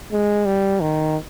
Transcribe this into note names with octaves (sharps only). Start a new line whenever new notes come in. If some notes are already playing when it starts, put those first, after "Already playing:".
G#3
G3
D#3